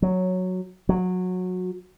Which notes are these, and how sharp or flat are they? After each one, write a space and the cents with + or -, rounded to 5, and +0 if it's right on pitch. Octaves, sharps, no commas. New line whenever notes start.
F#3 -5
F#3 -20